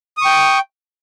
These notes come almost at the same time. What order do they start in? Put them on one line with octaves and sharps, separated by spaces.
D#6 C#6 G5